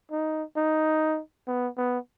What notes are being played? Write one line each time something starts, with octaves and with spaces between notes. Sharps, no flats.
D#4
D#4
B3
B3